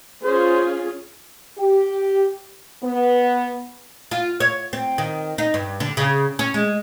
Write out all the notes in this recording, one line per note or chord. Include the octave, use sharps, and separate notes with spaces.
C#4 F4 G#4 C5
G4
B3
F4
C#5
C4
D#3
D#4
G2
D3
C#3
C#4
G#3